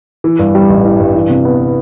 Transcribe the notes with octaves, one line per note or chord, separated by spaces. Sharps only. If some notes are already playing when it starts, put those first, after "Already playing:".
E3
G2
G3
A1
E3
G2
E3
C3
B3